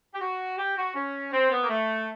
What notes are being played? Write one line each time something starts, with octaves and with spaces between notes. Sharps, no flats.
G4
F#4
G4
F#4
C#4
C4
B3
A#3
A3